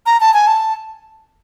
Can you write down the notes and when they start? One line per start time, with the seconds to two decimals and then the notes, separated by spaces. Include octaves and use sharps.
0.06 A#5
0.20 A5
0.34 G#5
0.47 A5